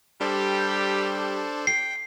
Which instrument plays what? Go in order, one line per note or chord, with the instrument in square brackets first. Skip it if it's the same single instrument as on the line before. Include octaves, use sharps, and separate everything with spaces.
[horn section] G3 G4 [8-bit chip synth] D4 A4 C5
[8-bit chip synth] G5 [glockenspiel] C7